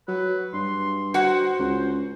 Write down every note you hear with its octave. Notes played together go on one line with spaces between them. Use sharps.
F#3 B4
G2 C6
F#4 C5 F#5
C#2